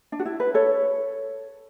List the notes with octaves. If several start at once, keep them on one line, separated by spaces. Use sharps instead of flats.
D4
F#4
E4
B4
A4 C#5